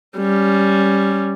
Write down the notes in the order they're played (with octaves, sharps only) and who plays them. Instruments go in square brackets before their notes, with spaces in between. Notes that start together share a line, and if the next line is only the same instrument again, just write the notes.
[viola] G3 C#4